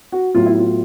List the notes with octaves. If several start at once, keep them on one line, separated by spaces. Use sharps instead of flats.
F#4
A2 F#3 B3 F4
E4
F4